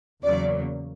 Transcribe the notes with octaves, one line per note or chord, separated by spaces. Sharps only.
E2 C#3 F#3 A#3 D5